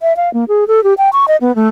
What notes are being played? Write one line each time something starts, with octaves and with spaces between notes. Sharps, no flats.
E5
F5
A#3
G#4
A4
G4
G5
C#6
D#5
B3
A3